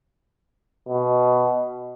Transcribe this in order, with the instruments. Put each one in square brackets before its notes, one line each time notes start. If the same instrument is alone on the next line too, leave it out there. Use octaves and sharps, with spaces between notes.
[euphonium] B2